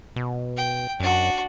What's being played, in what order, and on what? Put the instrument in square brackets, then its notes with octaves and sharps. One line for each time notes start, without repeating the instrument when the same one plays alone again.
[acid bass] B2
[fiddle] G5
[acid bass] F#2 [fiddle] D4 F#4